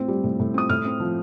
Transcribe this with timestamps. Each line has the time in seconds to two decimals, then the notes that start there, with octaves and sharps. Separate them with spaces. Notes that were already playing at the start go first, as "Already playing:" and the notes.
Already playing: A2 C4
0.08 G3
0.24 A2
0.39 A2
0.54 C4 D#6
0.69 A2 F6
0.85 C4
1.00 F3